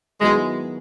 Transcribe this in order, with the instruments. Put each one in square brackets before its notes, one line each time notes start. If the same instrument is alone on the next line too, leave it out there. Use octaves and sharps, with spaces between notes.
[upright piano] D#3 F#3 B3 E4 G#4 [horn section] G#3